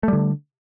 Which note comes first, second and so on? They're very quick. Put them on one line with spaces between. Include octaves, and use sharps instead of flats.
A3 G3 D3